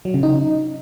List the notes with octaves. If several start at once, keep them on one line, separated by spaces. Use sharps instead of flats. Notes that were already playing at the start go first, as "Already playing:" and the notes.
F#3
C#3
D#4